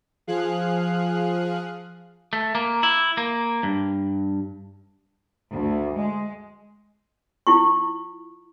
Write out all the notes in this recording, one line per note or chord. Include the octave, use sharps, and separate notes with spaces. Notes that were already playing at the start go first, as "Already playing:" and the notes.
F3 G#4 F5 F#6
A3
A#3
E4
A#3
G2
D2
G#3
E4 F4 C#6